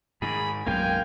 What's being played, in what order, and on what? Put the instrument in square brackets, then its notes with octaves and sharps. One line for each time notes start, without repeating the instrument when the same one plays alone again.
[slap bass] G#2 D#3 [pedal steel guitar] G#4 [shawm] B5
[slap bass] B1 F#2 G#3 [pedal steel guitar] A#3 F5 [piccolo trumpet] G5 [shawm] G#5